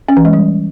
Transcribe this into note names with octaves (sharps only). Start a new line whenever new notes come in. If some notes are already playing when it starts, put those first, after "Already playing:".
C#4
E3
G#3
G3